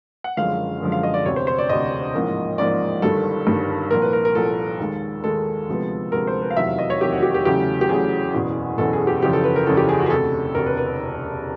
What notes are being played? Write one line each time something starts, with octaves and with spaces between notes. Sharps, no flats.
F#5
F#1 F#2 D3 F3 G#3 F5
F#1 F#2 D3 F3 G#3
F5
D#5
D5
E1 D2 C3 C#5
C5
C5
D5
E1 D2 C3 D#5
A1 G#2 F3 A#3
A1 G#2 F3 A#3 D5
G1 G2 D#3 G3 A4
G1 G2 D#3 G3
C2 A#2 F3 A#3 A#4
B4
A#4
A#4
C2 A#2 F3 A#3 A4
D#2 D#3 G#3
D#2 D#3 G#3 A4
D2 C3 F3 G#3 B3
D2 C3 F3 G#3 B3 A#4
C5
B4
F5
F1 E2 C3 D#3 F#3 E5
F5
D#5
C#5
F1 E2 C3 D#3 F#3 G4
F#4
G4
G4
E2 C#3 F#3 A3 C#4 G4
G4
E2 C#3 F#3 A3 C#4 G#4
F#1 E2 B2
F#1 E2 B2 A4
G#4
G4
F#1 E2 C#3 F3 G4
A4
B4
A#4
F#1 E2 C#3 F3 A4
G4
G#4
F#4
G#4
E1 D2 C3 A4
E1 D2 C3 A#4
B4
B4